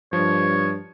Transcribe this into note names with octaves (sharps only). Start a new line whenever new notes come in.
G2 F3 C#5